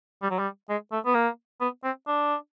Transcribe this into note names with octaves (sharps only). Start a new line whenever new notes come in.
G3
F#3
G3
G#3
A3
B3
A#3
B3
C4
D4